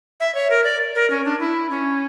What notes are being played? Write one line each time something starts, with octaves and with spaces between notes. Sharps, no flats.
E5
C#5
A#4
D5
A#4
C#4
D4
E4
C#4